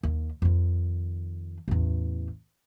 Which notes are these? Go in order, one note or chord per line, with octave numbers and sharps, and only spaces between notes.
D#2
F2 D#3
A1 E2